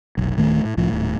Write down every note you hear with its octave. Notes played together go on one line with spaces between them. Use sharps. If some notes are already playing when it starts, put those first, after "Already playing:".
F1 B1
D1 D#3 A3
A2
C2 A2 F3
D#1 A2